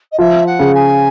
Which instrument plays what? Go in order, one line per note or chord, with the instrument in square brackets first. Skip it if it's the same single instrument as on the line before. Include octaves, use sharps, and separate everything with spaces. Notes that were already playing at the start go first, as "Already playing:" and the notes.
[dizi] D#5
[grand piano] F3 [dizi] E5
[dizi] F#5
[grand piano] C#3
[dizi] G#5